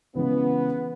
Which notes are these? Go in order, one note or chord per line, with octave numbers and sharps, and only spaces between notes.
C#3 E3 G#3 B3